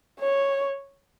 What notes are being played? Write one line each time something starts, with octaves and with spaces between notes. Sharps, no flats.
C#5